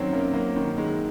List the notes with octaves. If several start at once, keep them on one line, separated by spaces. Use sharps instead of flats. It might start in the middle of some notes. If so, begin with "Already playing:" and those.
Already playing: F#2 D#3 F#3 C4 C#4
F#2 A#3
F#3 A#3
D#3
D#3 G#3